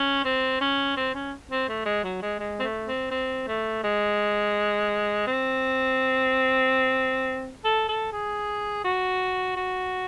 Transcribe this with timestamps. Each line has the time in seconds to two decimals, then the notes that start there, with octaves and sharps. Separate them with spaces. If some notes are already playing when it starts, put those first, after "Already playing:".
Already playing: C#4
0.24 C4
0.61 C#4
0.97 C4
1.14 C#4
1.51 C4
1.69 A3
1.85 G#3
2.04 F#3
2.22 G#3
2.39 G#3
2.60 C4
2.63 A3
2.87 C4
3.11 C4
3.48 A3
3.84 G#3
5.27 C4
7.65 A4
7.89 A4
8.12 G#4
8.84 F#4
9.56 F#4